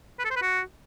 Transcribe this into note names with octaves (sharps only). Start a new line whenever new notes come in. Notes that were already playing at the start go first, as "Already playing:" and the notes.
B4
A4
C5
B4
F#4